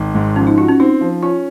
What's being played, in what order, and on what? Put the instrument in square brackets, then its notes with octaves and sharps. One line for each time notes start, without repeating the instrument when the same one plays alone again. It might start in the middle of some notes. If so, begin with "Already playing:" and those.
Already playing: [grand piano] G#1
G#2
[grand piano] F3 [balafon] C#4
[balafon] D#4
[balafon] F4 [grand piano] F#4
[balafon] C#4
[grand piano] C4 [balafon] D#4
[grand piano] F3
[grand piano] C#4 [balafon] F4